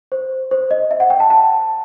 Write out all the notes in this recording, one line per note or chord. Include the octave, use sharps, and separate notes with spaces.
C5
C5
D#5
E5
F#5
G5
A5
A5